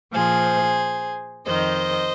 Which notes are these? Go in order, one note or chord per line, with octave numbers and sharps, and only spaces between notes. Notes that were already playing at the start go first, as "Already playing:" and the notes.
A#2 F3 G#4 C5
F2 D#3 C5 D#5